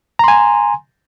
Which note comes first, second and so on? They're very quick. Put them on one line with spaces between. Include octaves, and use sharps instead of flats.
A#5 C6 G#5